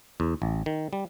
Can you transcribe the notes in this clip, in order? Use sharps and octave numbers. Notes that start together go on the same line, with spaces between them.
E2
A1
D#3
G3